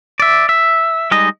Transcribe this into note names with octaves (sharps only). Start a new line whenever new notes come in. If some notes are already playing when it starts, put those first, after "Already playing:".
D5 E5
E5
G3 G#3 D#4 D#5